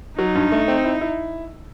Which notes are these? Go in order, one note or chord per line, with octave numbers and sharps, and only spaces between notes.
F#3 D#4
G2
A3
C4
E4
E4